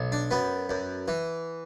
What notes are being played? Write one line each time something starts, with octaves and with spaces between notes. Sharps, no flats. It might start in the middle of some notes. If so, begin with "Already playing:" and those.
Already playing: B1
D4
F#2 B3
F#2
E3